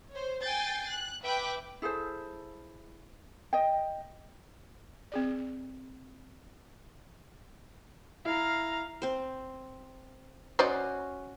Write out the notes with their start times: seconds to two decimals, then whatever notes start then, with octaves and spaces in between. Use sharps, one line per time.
0.11 C5 C#5
0.42 G5 G#5 G6 A6 C7
0.90 F#6
1.23 B4 E5 G5 D6 F#6
1.82 E4 G#4 A4 C5
3.53 D#5 G5
5.12 C4 G#4 D5
8.25 E4 F5 A#5
9.02 C4 C5
10.59 C#4 F#4 C5 D5 D#5